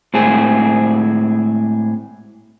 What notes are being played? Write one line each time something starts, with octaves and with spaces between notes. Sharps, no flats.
A2 G#3 C4 G#4